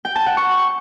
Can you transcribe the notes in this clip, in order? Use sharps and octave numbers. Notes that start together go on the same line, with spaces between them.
G5
A5
F#5
C#6